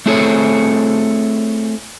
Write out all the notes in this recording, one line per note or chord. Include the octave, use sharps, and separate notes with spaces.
A3 C4 E4 G#4 A4 C#5